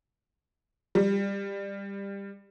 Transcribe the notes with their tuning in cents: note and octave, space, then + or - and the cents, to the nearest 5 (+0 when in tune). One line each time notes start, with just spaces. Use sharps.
G3 +20